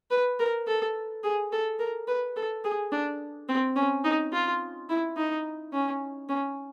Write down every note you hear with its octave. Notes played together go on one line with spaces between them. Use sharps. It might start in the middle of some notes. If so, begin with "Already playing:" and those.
B4
A#4
A4
G#4
A4
A#4
B4
A4
G#4
D4
C4
C#4
D#4
F4
E4
D#4
C#4
C#4